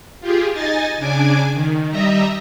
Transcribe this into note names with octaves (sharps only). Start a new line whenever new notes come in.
F4 G4 G#4
D#4 D#5 G#5 A6
C#3 D4 G#5 D6
D#3
G3 D#5 E5 A#5